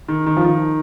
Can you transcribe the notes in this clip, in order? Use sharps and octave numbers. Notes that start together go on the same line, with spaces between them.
D#3
D#3
F3
D#3